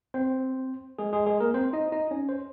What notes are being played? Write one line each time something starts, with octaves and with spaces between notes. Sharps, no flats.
C4 C5
G#3 G#4
G#3 G#4
G#3 G#4
A#3 A#4
C4 C5
D#4 D#5
D#4 D#5
C#4 C#5
C5